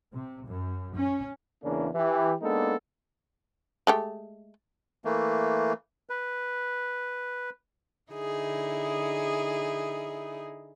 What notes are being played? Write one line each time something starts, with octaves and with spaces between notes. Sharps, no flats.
C3
F#2
C#4
E2 C#3 E3 A#3 D4
E3 G4
G#3 A#3 B3 D4 D#4 A4
G#3 A3 G4
E3 A3 A#3
B4
D3 D#4 E4 G#4